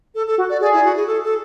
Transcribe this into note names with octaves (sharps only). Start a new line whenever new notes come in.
A4
A4
F#4
D5
G#4 D5
E4
F#4
G#4
A4
A4